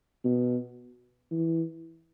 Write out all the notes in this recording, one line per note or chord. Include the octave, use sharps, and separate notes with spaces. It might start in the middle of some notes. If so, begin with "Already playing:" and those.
B2
E3